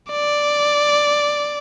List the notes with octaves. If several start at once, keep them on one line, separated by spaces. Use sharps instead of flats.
D5